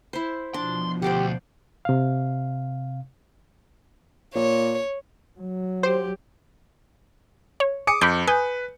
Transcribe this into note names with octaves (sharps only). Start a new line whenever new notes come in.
E4 C5
B2 F3 D4 C6
D2 G4 C5 D5 F#5
C3 F5
A#2 C#5
F#3
G4 C5
C#5
G#4 D6 D#6 C#7
F2 B5 D6 G6
B4 G#5 D#6 G6